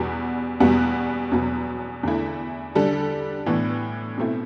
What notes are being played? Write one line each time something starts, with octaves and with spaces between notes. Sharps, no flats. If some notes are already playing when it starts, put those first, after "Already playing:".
Already playing: E2 B2 G3 B3 F#4
E2 B2 G3 B3 F#4
E2 B2 F#3 B3
E2 D3 A3 E4
D3 G3 D4 A4
A2 E3 B3 D4
B2 A3 C4 E4